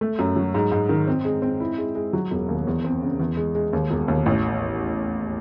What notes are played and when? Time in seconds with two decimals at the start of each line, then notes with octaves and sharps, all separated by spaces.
0.01 A3
0.19 F#2
0.36 F#3
0.54 G#2
0.72 G#2
0.89 D#3
1.07 C4
1.25 G#3
1.42 C4
1.60 E4
1.78 G#3
1.95 G#3
2.13 F#3
2.31 E1
2.49 D#2
2.67 E2
2.84 C4
3.02 C#3
3.20 E2
3.37 G#3
3.55 G#3
3.73 D#2
3.91 E1
4.08 D#2
4.26 A1